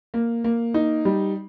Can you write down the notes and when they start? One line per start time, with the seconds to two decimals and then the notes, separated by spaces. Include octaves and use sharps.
0.14 A#3
0.44 A#3
0.74 D#4
1.05 G3